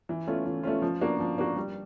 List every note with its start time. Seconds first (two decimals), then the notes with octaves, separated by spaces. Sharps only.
0.09 E3
0.27 A3 C#4 F4
0.45 E3
0.63 A3 C#4 F4
0.82 F3
1.01 A#3 D4 F#4
1.20 F3
1.38 A#3 D4 F#4
1.56 G3